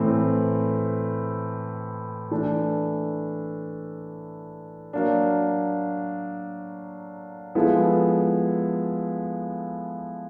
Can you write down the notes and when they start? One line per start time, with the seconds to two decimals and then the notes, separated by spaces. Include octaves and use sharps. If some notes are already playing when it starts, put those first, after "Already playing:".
Already playing: A2 E3 A3 C4
2.31 E3 A3 D4
4.93 F#3 A#3 D4
7.55 F3 G#3 B3 E4 A4